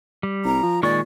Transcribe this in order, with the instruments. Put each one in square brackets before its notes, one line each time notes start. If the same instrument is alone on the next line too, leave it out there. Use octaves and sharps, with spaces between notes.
[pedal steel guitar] G3
[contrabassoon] C2 [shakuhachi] A#5
[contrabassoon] F3
[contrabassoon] A#2 [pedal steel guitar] D#3 G#3 C#6 [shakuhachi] D5